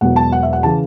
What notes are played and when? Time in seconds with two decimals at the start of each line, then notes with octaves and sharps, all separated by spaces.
0.01 E1 E2 B2 F#3 F#5
0.16 A5
0.32 F#5
0.43 E5
0.53 F#5
0.63 C#3 E3 A5